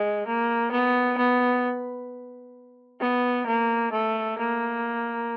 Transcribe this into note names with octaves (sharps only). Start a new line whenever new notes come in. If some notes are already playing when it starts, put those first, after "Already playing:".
Already playing: G#3
A#3
B3
B3
B3
A#3
A3
A#3